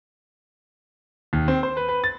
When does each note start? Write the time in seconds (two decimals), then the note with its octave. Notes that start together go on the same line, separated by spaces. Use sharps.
1.33 D#2
1.48 C4
1.63 C5
1.77 B4
1.89 B4
2.04 A6